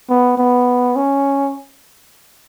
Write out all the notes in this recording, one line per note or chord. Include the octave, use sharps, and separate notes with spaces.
B3
B3
C#4